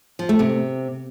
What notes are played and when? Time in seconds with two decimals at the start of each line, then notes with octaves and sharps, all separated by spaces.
0.19 F3
0.29 A3
0.39 C3